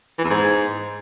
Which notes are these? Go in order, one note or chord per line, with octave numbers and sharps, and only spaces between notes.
E3
E2
G#2